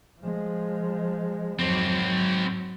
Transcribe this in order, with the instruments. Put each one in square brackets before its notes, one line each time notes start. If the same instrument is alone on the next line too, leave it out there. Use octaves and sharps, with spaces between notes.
[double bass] F3 G#3
[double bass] F2 F#3 [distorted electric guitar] G#2 C4
[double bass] F#3